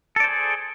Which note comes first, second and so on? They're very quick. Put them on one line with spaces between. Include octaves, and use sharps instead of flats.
A4 D5 C5 G#4